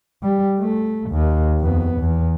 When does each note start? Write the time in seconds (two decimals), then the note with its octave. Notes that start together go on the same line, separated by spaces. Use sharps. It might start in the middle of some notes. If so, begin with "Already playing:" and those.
0.23 G3
0.58 A3
1.11 D#2
1.60 F2 B3
2.00 E2